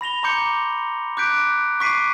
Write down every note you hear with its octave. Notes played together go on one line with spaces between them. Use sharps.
B5 A#6 F7 G7
A#5 C6 D6 G6 C#7 G7
D6 F#6 G6 B6 D7
C#6 D6 B6 C7 D7 D#7